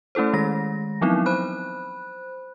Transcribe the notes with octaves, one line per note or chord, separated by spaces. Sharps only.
A3 C#4 E4 A4 C5
D#3 G#3 A#6
F3 F#3 B3 C4 D#4 E4
C5 B5 F#6